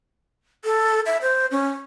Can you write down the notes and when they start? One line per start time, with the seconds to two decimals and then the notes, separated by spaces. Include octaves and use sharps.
0.65 A4
1.06 E5
1.22 C5
1.51 C#4